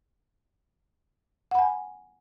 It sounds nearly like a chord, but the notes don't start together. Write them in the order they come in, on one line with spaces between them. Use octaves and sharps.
F#5 B5 G#5